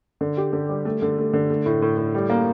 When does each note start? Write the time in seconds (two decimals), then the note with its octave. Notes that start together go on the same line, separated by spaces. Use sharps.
0.21 D3
0.37 G4
0.53 D3
0.69 G3
0.85 A3
1.02 D3
1.18 A3
1.33 D3
1.50 A3
1.66 A2
1.82 A2
1.98 A2
2.14 G3
2.30 A#3